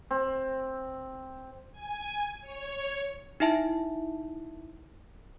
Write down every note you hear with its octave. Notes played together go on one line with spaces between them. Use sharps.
C4
G#5
C#5
D#4 E4 E5 A5